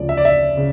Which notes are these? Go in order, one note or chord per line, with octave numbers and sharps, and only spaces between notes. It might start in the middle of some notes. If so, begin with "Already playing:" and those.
Already playing: D2 C#3 F3 D5
E5
D5
E5
C#3